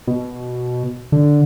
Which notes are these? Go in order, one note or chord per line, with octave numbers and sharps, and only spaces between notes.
B2
D3